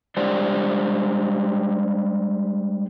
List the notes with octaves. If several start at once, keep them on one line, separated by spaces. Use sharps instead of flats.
G3 G#3 D4 G4 C5 D5